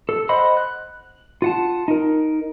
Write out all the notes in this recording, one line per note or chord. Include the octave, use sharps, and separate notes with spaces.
A4
C5 D#5 F#5 B5 C6
F#6
F4 F#5 A5
D#4 A#4